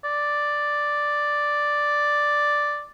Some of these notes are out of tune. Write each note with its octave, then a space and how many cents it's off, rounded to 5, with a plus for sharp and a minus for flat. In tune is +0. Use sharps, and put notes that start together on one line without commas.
D5 +0